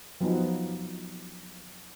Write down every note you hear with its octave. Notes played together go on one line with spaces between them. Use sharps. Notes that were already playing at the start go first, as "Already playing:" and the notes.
F3 F#3 B3 D#4